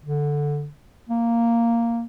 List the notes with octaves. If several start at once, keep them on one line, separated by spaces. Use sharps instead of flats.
D3
A#3